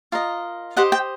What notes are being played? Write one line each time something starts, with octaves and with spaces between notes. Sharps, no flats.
F4 A#4 D#5
G4 C5 D#5 F#5
G5